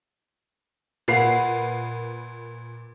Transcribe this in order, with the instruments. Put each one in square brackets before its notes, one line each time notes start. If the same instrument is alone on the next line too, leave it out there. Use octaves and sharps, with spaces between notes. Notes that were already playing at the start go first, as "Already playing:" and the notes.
[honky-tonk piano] A#2 B4 C7 [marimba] A#4 F5 F#5